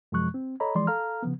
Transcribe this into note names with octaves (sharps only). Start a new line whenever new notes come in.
F#2 C3 F3 G#3 C#6 F#6
C4
A4 C#5 D#5 A#5 B5
E3 F3 G#3 D5 C6
A4 F5 A#5 F6
C#3 F3 B3